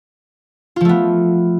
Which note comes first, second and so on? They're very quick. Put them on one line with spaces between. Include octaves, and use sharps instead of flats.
F4 F3 A3 B3